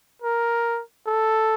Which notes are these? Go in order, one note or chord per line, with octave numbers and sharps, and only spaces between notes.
A#4
A4